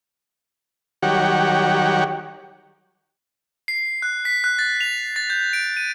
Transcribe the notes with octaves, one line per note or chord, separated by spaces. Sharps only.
D#3 F#3 G3 G4 C#5 F#5
C7
F#6
B6
F#6
A6
F7
A6
G6
D7
D#7